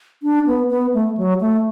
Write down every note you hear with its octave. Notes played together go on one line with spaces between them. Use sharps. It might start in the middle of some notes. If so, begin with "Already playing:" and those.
D4
B3
B3
A3
F#3
A3